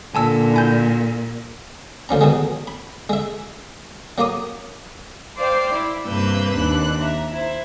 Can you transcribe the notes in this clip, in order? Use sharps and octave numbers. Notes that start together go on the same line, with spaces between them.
A#2 D3 G#5 A5 E6
E4 G#5 G6
D2 F3 C#4 A#5
B2 D#3 E3 F#3 G#3
B5
G#3 E5
F#3 A#3 A#5 D6 D#6
C5 D5 F5 G5
E4
G2 C3 A#3 B4 E6 G6
D#2 D4 F#6
E5 A#5
E4 C5